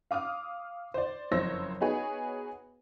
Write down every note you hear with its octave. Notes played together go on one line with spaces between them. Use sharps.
F5 D6 D#6 F6
C5 D5
F#1 F2 C5 C#5 E6 A#6
B3 D#4 F#4 G#4 B4 C#5